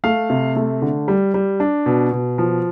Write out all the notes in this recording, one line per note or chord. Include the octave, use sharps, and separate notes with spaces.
A3 F5
C3
A3
D3
G3
G3
D4
B2
B2
F3